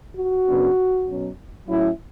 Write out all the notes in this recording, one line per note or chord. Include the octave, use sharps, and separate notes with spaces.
F#4
F#2 C#3 F#3 B3 D4
B2 F#3 C#4
A2 F#3 C#4 E4